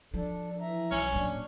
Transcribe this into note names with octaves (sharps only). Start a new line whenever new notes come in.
F3 D4 A4
E3 E5 A#5
B1 C#4
A#2 F#3 D4